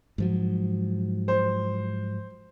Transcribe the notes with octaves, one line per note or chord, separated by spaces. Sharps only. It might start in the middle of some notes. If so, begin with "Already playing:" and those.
G#2 F3 F#3
C5